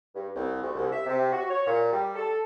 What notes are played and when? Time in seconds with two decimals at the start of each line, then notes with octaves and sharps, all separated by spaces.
0.15 G2
0.35 C2
0.62 D2
0.75 C2
0.92 E5
1.06 C3
1.32 F#4
1.50 C#5
1.67 A#2
1.92 G3
2.15 A4